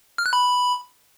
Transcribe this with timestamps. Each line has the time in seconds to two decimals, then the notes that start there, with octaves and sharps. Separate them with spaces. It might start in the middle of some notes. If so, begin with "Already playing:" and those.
0.18 F6
0.26 F#6
0.33 B5